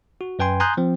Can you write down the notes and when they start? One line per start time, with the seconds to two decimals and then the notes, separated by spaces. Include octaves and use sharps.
0.21 F#4
0.39 F#2 B4 G5 G#5 C6
0.60 G#5 A#5 C6 D#6 F#6 G6
0.77 F3 C4